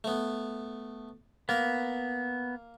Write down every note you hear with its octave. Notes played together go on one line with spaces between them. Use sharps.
A3 B3
A#3 B3 A#4